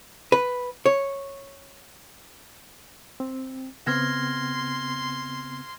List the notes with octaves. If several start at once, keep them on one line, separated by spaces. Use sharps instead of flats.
B4
C#5
C4
C#3 B3 C4 C6 F6 G#6 A#6